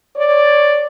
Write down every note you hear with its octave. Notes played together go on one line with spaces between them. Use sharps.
C#5 D5